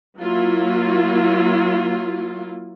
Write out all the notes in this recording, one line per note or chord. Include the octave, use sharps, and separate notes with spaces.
F#3 A#3 E4 F4